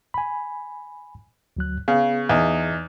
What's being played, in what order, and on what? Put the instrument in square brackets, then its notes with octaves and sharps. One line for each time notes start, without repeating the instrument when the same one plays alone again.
[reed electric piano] G#5 B5
D2 F#3 F#6
[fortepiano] C#3 [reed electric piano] B3 G#4
[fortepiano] E2 D#4